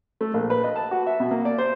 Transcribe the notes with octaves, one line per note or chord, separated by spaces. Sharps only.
A3
A#1
B4
D#5
A5
F#4
E5
B2
A#3
D5
C5